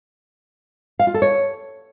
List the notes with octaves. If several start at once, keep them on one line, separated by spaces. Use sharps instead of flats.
F5
F4
A4
C#5